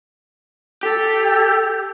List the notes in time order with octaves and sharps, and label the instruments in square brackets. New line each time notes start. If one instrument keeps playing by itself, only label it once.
[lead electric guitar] G4 [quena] A4